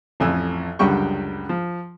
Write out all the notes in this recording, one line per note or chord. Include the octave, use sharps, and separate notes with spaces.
A1 F2 G#5 E6
C#2 F#2 D3 G3 G5 C#6
F3